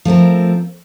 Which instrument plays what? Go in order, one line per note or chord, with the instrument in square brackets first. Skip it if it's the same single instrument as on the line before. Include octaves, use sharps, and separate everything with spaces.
[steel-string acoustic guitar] F3 A3 C4 A#4